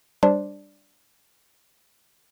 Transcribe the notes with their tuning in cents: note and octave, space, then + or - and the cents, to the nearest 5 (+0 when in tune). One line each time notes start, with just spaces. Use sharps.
G3 +10 D4 +0 C5 +0